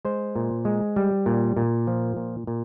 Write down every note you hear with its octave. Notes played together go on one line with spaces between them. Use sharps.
G#3 C5
A#2
G#3
G3
A#2
A#2
F3
A#2
A#2